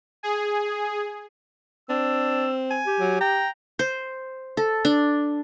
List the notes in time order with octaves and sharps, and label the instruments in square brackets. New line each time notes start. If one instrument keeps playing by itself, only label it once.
[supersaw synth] G#4
[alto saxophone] C4 [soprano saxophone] D4 [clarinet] E6
[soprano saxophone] G#5
[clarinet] G4
[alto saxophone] F#3
[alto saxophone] G5 [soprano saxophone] A#5
[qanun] C5
A4
D4